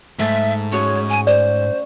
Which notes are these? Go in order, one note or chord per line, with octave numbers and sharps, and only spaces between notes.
G#2 A3 E5 A6 B6
C#4 F#4 G#4 C#5
G#5
C5 D5